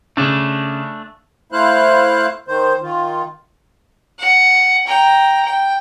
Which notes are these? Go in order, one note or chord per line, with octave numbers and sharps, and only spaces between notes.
C#3 A3 D4
A3 E4 C5 F5 F#6
D#3 C5
D#3 F4
F#5
G5 A#5
G5